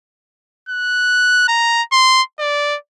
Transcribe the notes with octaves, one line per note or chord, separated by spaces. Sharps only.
F#6
A#5
C6
D5